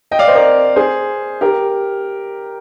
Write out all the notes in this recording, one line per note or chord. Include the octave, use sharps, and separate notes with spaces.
D#5 G5
D5 F5
C5 D#5
A#4 D5
G#4 C5
G4 A#4